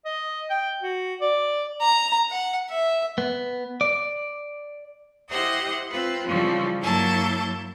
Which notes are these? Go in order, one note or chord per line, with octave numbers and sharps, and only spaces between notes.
D#5
G5
F#4
D5
A#5
F#5
E5
B3
D5
E4 G4 C5 D#5 F#5 D#6
C4 F4 B4
C#3 E3 F3 G3
G2 F#3 A#3 E4 A5 G6